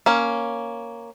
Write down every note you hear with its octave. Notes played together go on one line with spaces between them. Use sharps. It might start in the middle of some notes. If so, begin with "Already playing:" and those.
A#3 C#4